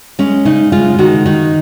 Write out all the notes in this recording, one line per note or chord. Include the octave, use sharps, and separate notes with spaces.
G#3 C#4
C#3 D#4
G#3 F4
D#3 F#4
D#3